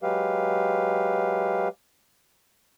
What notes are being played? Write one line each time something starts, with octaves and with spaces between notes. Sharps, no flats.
F#3 G#3 G4 B4 F5